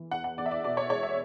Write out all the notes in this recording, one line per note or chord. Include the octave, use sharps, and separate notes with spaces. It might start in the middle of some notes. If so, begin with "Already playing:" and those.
Already playing: E3
E2 F#5
F#5
E2 D5
E5
D5
B2 D5
C#5
G#3 C#5
E5